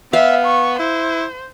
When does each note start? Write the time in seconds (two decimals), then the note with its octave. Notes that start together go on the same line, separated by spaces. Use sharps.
0.13 B3 E5 F5
0.46 C#6
0.79 E4 C5